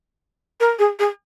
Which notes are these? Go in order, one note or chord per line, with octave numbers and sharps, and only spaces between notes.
A#4
G#4
G#4